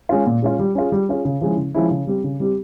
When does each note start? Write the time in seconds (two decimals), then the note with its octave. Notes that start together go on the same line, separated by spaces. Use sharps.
0.09 G#3 C#4 F4
0.26 A#2
0.42 G#3 C#4 F4
0.59 G3
0.75 C#4 F4 G#4
0.92 G3
1.09 C#4 F4 G#4
1.25 C#3
1.41 F3 G#3 C#4 E4
1.57 C#3
1.74 F3 G#3 C#4 E4
1.91 C#3
2.07 G3 C4 G4
2.24 C#3
2.40 G3 C4 G4